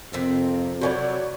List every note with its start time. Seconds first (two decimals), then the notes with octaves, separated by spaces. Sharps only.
0.13 F2 C3 D#3 C4
0.81 C3 F#3 E4 F#4 C#5 D5